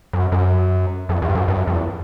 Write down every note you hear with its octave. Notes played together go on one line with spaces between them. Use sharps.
F#2
F#2
F2
E2
G2
F#2
G2
F#2
F2
E2